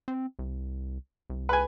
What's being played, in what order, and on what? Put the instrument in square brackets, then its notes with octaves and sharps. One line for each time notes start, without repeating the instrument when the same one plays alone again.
[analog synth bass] C4
C2
C2
[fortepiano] B4 G#5